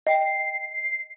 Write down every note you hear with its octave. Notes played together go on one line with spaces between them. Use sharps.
D#5 G5 C7